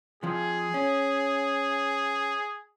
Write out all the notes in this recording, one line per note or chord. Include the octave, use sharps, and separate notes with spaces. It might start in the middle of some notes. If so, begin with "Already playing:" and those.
F2 F3 G#4
C#4